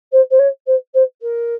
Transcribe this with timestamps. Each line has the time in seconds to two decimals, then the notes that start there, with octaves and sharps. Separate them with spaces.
0.12 C5
0.30 C5
0.39 C#5
0.66 C5
0.94 C5
1.21 A#4